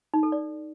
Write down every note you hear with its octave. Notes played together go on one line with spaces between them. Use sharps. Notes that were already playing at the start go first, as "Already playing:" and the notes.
D#4
A4
D5